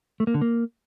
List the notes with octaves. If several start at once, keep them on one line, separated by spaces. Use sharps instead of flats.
A3
A#3
D3
A#3